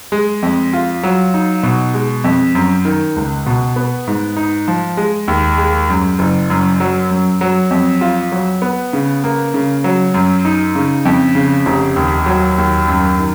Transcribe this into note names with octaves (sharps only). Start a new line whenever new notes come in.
G#3
F2
F4
F#3
D#4
B2
G#3
F2
F#2
D#3
C#2
B2
B3
G#2
D#4
F3
G#3
D#2
G#3
F#2
F#1
F#2
F#3
F#2
F#3
F2
F4
F#3
B3
C#3
A#3
C#3
F#3
F#2
D#4
C#3
F2
C#3
F1
D#2
F#3
D#2
F#2
D#3